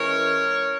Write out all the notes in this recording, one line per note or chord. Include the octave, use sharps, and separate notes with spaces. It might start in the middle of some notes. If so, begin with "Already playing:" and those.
Already playing: E3 G#3 C#4 A#4 C#5